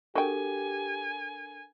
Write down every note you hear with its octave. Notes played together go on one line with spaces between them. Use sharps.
D4 F#4 G4 A4 A#4 G5 G#5